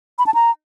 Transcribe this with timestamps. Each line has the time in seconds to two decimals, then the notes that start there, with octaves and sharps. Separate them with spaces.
0.19 B5
0.26 A5
0.34 A#5